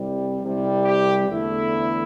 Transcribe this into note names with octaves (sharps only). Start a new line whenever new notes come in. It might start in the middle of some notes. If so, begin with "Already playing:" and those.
Already playing: C2 C3 G3
C2 C3 G3
G4
E2 D3 A3 E4